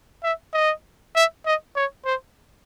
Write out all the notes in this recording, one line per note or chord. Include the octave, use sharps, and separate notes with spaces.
E5
D#5
E5
D#5
C#5
C5